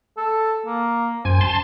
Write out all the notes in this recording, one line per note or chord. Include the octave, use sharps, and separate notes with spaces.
A4
A#3
F#2 C5 G#5
A5 C6